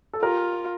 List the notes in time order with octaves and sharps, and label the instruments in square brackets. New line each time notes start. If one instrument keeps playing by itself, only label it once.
[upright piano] A4
[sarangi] F4 [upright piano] G4 A#4